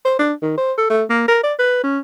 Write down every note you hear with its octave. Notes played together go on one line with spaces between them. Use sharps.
C5
D4
D#3
C5
A4
A3
A#3
A#4
D5
B4
C#4